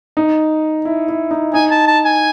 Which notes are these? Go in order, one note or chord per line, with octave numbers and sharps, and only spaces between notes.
D#4
E4
E4
D#4
D#4 G#5
A5
A5
G#5